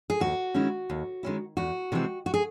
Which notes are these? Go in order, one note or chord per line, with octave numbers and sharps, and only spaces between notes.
G#4
D#2 F#4
D#3 G#3 C#4 E4
D#2
D#3 G#3 C#4 E4
E2 F#4
C3 E3 G#3 C4
F#4
G#4